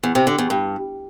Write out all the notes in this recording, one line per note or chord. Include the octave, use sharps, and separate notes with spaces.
E2
C3
D3
E2
G2